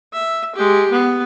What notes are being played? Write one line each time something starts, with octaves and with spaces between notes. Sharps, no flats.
E5
G#3 G4
B3